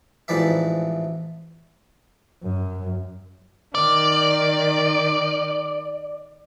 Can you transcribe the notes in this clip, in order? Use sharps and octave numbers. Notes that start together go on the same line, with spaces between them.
A1 G#2 E3 F3 D5 E5
F#2
D#3 D5